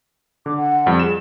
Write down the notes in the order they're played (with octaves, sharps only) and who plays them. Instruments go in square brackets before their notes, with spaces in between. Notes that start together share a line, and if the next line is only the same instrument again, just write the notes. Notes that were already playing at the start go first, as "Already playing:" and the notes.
[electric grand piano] D3 [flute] D6
[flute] F#5
[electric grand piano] F2 G3
[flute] G#4 [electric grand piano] E7